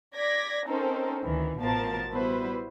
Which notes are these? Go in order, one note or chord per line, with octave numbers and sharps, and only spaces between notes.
D5 G#6 A#6 B6
C4 C#4 D#4 A4 A#4 C5
D2 D#3 E3
A1 B2 F3 A#4 A5 A6
G3 B3 E4 F#4 B4 C5